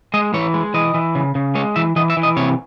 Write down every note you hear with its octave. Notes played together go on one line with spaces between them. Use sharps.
G#3 D#5
E3 C#5
G#3
E3 D#5
E3
C#3
C#3
G#3 C#5
E3 E5
E3 D#5
E5
E3
D#5
C3 C#5